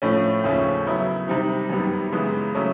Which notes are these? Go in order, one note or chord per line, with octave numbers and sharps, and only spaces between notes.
A2 F3 A3 C#4
D#2 C#3 F3 A3 C#4
C#3 F#3 B3 E4
C3 D#3 G3 C4 D#4
F#2 D#3 G3 B3
F#2 C#3 E3 G#3 B3
C#3 F#3 A3 C#4